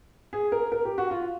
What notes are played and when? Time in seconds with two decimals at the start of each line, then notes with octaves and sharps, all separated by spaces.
0.33 G#4
0.52 A#4
0.72 A#4
0.85 G4
0.98 F#4
1.11 F4